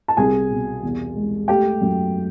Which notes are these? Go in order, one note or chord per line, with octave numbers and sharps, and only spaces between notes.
A5
C2 G#4 G#5
B2
E2
G#3
A3 G4 G5
F#2